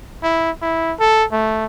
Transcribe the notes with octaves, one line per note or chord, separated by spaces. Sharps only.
E4
E4
A4
A3